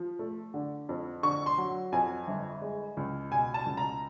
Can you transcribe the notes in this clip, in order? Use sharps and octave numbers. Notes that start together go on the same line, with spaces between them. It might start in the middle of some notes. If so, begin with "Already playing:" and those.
Already playing: F3
A3
D3
F2
D3 C#6
C6
F#3
F2 G#5
G1
G#3
C#2
B2 G#5
A5
C#2
A#5